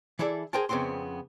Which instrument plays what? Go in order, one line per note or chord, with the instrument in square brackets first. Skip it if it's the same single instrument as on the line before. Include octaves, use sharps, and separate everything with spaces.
[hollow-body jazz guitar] E3 E4 G#4 A4 D5
G#4 A#4 C5 G5 A5
F2 C#3 B3 C4 C6